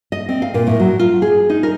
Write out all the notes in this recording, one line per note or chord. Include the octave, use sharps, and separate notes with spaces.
D#5
C4
F5
A#2
A2
F#3
F4
G#4
D#4
A#4